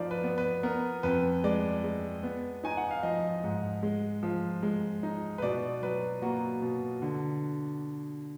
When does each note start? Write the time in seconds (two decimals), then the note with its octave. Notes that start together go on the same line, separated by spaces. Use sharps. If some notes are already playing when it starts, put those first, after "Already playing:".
Already playing: F3 D#4 D5
0.11 B4
0.23 B3
0.38 B4
0.63 B3 A#4
1.03 F2 B4
1.44 G#3 D5
1.84 G#3
2.23 B3
2.64 D#4 G#5
2.77 F#5
2.91 F5
3.03 F3 D#5
3.44 G#2
3.83 G#3
4.23 F3
4.62 G#3
5.03 D#4
5.38 B4
5.42 B2 D5
5.82 F#3 B4
6.22 A#3 F#4
6.62 B2
7.02 D3